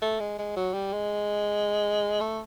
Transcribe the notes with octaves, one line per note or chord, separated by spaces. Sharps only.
A3
G#3
G#3
F#3
G3
G#3
A3